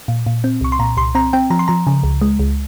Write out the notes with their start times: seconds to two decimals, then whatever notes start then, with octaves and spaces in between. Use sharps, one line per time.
0.08 A#2
0.26 A#2
0.44 C4
0.61 C2 C#6
0.72 C6
0.79 A#2 A#5
0.97 C2 C6
1.15 C4 A#5
1.33 C4 G5
1.50 F3 A#5
1.59 C6
1.68 F3 A#5
1.87 C#3
2.04 C#2
2.21 G#3
2.39 C#2